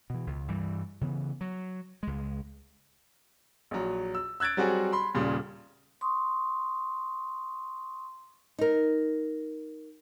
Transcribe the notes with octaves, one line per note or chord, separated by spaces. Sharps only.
B2 E3
C#2
G2 E3 G3
C#3 E3 B3
F#3
C#2 G#3
A#1 F#3
E6
E6 F#6 G#6 A6 D7
F#3 G3 C4 F#4 G#4
B5 C6
D#1 A#2 C#3 G3 C6
C6 C#6 D#6
D#4 A#4